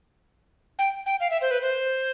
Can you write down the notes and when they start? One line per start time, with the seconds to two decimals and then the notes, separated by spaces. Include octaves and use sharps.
0.79 G5
1.06 G5
1.20 F5
1.30 E5
1.42 C5
1.51 B4
1.62 C5